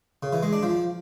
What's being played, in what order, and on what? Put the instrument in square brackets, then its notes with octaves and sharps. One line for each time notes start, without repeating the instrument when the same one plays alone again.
[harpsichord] C#3
E3
G#3
D4
F3